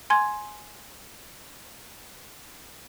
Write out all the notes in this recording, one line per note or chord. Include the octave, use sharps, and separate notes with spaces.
G#5 C6 G#6